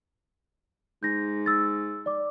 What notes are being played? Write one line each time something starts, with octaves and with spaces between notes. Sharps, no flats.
G#2 G6 A#6
E6 A6
D5 D6